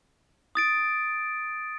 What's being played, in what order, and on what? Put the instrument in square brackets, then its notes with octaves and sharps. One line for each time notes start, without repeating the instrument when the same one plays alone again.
[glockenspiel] D#6 A6 D7